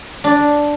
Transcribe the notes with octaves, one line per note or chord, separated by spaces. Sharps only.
D4